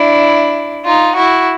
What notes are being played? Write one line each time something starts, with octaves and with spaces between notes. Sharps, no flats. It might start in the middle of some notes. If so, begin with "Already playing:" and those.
Already playing: D4 E4
D#4 F4
E4 F#4